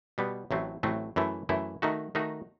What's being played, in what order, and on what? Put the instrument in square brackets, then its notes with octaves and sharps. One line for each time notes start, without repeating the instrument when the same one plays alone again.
[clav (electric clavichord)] B2 G3 B3
A1 A2 F#3 A3 C4
A1 A2 F#3 A3 C4
F#2 E3 A3 E4
F#2 E3 A3 E4
D#3 A3 D#4 F#4
D#3 A3 D#4 F#4